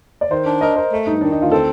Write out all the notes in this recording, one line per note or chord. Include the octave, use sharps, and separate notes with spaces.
D5
D#3 C5
D4
A#4 D#5
A#4 C5
A3
G2 D#4
D#3 D4
D2 D#4
F4
C4 A4